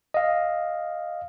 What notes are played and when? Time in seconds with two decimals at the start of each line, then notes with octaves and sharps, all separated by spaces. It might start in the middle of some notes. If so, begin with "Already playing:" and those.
0.14 D#5 F5